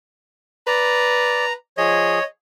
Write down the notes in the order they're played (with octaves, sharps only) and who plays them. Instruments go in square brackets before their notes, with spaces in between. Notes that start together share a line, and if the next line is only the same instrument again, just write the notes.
[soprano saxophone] B4 [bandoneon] D5 [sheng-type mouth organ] A#5
[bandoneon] F3 G#4 [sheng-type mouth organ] C#5 [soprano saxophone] D#5